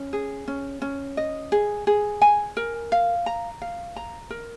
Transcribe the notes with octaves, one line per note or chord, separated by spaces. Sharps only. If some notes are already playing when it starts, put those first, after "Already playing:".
Already playing: C#4
G#4
C#4
C#4
D#5
G#4
G#4
G#5
A#4
F5
A#5
F5
A#5
A#4